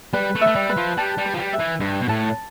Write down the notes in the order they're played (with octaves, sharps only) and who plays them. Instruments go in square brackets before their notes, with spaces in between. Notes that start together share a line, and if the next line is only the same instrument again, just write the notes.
[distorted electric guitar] G3 [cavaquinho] B4
[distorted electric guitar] A3
[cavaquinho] E5
[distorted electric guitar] A3
G3
[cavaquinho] B4
[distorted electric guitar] F3
[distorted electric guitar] G3 [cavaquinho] A5
[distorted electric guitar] G3
[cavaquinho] B4
[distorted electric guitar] F3
G3
[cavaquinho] E5
[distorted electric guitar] E3
[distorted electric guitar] G2 [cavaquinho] B4
[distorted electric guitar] B2
[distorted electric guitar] A2 [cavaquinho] A5